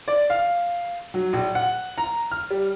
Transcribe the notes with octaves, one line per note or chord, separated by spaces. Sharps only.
D5
F5
F#3
A#1
F#5
A#5
F6
G3